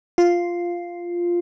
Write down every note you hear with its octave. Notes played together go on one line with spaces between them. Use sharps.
F4